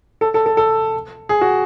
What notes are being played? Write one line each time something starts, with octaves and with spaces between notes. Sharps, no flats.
A4
A4
A4
A4
G#4
F#4